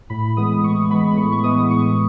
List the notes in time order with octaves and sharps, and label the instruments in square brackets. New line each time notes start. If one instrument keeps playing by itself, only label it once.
[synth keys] A2 B5
E3 G#3 B3 D#6
A2 C#6
E3 G#3 B3 B5
B5
A2 C#6
C#6
E3 G#3 B3 D#6
A2 C#6